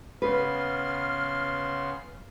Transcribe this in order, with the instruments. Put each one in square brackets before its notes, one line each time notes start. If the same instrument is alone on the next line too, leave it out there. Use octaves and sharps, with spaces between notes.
[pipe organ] C#3 B3 C6 [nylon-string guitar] B4 [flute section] F6